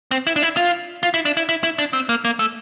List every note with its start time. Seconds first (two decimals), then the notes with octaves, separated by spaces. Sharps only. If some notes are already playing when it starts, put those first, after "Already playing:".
0.11 C4
0.27 E4
0.36 D4
0.42 E4
0.57 F4
1.03 F4
1.14 E4
1.25 D4
1.37 E4
1.49 E4
1.63 E4
1.78 D4
1.93 C4
2.09 A#3
2.25 A#3
2.39 A3